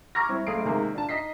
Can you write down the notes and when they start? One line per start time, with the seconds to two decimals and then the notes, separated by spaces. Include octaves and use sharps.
0.15 A#5 C#6 D6 F6 G#6 A#6
0.29 G3 C4 E4
0.47 F#1 A3 F5 D#6 C7 D7
0.65 C3 D#3 G#3 A#3
0.94 D4 F4 A5
1.09 D#4 D#5 B6 C7